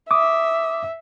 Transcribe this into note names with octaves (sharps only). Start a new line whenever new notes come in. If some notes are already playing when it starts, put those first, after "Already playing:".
E5 D6 D#6